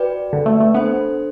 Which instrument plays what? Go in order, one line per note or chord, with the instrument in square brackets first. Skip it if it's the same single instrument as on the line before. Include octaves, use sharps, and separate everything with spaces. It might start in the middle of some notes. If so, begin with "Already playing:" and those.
Already playing: [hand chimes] F#4 B4 D5 G5
[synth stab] D3
A3
A3
[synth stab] B3 [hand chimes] D4 A4 C5